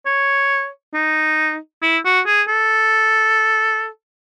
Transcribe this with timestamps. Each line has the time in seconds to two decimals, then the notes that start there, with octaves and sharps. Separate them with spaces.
0.06 C#5
0.94 D#4
1.82 E4
2.05 F#4
2.26 G#4
2.48 A4